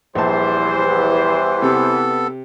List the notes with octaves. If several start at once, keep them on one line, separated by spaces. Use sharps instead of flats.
A#1 E2 E3 G3 G4 C5 A5
C3 B3 A4